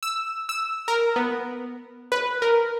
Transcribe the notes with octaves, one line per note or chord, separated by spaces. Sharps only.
E6
E6
A#4
B3
B4
A#4